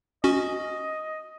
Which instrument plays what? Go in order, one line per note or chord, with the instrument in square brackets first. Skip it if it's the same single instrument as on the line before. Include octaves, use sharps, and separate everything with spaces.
[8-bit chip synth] C#4 F#4 [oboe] D#5